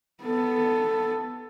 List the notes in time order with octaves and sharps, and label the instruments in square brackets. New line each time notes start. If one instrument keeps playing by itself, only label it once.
[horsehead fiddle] B3 A4